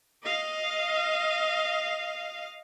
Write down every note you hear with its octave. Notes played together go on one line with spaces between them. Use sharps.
D#5 F5